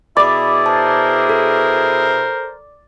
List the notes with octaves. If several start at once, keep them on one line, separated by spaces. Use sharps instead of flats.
B2 E4 G#4 D5 B5 D6
A#4 C5 A5
A4